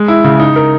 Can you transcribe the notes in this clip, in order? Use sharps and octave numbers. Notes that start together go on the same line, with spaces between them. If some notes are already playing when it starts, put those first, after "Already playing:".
Already playing: G#3
E4
C#3
D#4
A#4